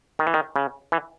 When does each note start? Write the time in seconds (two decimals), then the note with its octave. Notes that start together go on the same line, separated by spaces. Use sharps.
0.19 D#3
0.27 E3
0.34 D#3
0.56 C#3
0.92 E3